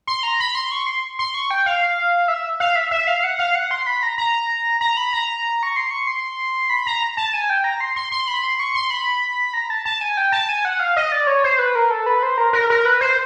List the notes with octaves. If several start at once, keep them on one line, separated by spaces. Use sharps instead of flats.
C6
A#5
B5
C6
C#6
C6
C6
C#6
G5
F5
E5
F5
E5
E5
F5
F#5
F5
F#5
C6
B5
A#5
A#5
A#5
B5
A#5
C#6
C6
C#6
C6
B5
A#5
A5
G#5
G5
A#5
C6
C6
C6
B5
C6
C#6
C6
B5
A#5
A5
A5
G#5
G5
A5
G#5
F#5
F5
D#5
D5
C#5
C5
B4
A#4
A4
B4
C5
A#4
A#4
A#4
B4
C5